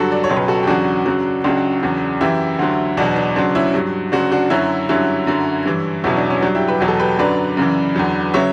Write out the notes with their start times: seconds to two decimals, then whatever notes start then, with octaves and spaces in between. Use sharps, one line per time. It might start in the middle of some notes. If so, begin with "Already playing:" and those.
Already playing: G2 D3 F#3 F#4 A4
0.12 D5
0.24 C#5
0.30 C#2 B2 F#3
0.36 B4
0.48 F#4 A4
0.63 G4
0.67 E2 C#3 F#3 D4 F#4
1.06 F#2 C#3 F#3
1.44 C#2 C#3 F#3 D4 F#4
1.83 E2 C#3 F#3
2.21 F#2 E3 E4 G4
2.59 D2 D3 F#3
2.97 E2 B2 F#3 D4 F#4
3.16 D4
3.36 D2 C#3 F#3 D4
3.55 C#4 E4
3.74 G2 F#3
4.12 D2 C#3 F#3 D4 F#4
4.32 D4 F#4
4.50 F#2 D3 F#3 C#4 E4
4.89 G2 D3 F#3 C#4 E4
5.27 F#2 D3 F#3
5.66 G2 E3
6.04 E2 B2 F#3 C#4 E4
6.17 D4
6.30 C#4
6.42 G2 F#3 D4
6.55 E4 G4
6.68 G4 B4
6.80 E2 B2 F#3
6.88 A4
7.00 G4 B4
7.19 F#2 D3 F#3 B4 D5
7.57 F#2 C#3 E3
7.96 E2 D3 F#3
8.34 C#3 F#3 C#5 E5